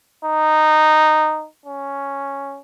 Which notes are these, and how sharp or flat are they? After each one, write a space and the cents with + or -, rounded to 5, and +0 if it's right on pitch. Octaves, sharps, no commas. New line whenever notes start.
D#4 -10
C#4 +0